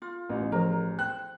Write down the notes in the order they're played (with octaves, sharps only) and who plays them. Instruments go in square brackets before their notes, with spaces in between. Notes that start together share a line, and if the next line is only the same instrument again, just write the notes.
[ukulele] F4
[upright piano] A1
[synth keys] F3 G#4 C5 [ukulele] A#4 C#5 A#5
[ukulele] C5 [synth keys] G5 [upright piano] F#6